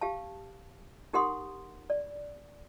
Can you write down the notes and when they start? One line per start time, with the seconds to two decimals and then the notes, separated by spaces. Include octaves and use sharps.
0.01 G4 F5 A5
1.13 D#4 G4 A#4 F#5 C6 D#6
1.90 D5